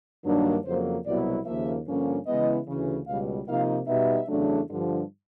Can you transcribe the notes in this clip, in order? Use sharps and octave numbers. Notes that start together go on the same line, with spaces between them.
G2 D#3 F#3 A#3 D4
F2 C#3 F#3 A#3 C5
C2 B2 F#3 B3 E4 D5
D#2 C#3 F3 A#3 E5
G2 D3 F3 A#3 C#4
C#3 E3 G#3 B3 E4 D#5
D2 C#3 E3
C#2 B2 G3 F5
C3 F3 A#3 D#4 F5
B2 G3 B3 D#4 E5
E2 C#3 F#3 A3 D4
G2 D3 F3